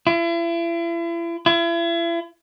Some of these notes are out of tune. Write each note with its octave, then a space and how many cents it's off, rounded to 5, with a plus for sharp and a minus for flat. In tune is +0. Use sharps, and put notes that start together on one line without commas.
E4 +40
E4 +40